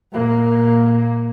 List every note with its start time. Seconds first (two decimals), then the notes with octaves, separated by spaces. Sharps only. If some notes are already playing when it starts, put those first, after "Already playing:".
0.13 A#2 A#3